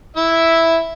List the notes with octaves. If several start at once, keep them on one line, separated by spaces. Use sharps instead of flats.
E4 E5